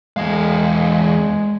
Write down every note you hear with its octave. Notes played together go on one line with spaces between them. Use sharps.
E2 G#3 F5